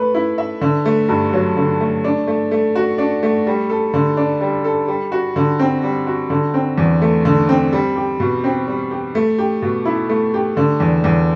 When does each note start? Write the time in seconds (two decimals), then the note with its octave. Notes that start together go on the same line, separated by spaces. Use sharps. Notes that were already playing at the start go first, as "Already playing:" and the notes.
Already playing: A3 B4
0.14 E4
0.38 E5
0.61 D3
0.85 A3
1.09 G2
1.33 F#3
1.57 D3
1.80 A3
2.04 D4
2.27 A3
2.51 A3
2.75 F#4
2.98 D4
3.23 A3
3.47 G3
3.70 A4
3.94 D3
4.17 D4
4.41 G3
4.64 A4
4.88 G3
5.12 F#4
5.36 D3
5.59 C4
5.83 G3
6.07 F#4
6.30 D3
6.54 C4
6.78 E2
7.02 A3
7.25 D3
7.49 C4
7.73 G3
7.96 G4
8.20 B2
8.44 C4
8.67 G3
8.91 G4
9.15 A3
9.38 G4
9.62 B2
9.85 E4
10.09 A3
10.34 G4
10.57 D3
10.80 E2
11.04 E2